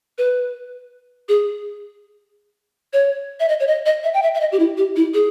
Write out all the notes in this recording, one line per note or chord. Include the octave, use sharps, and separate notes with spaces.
B4
G#4
C#5
E5
D#5
C#5
D#5
D#5
E5
G5
E5
E5
D#5
G4
E4
G4
E4
G#4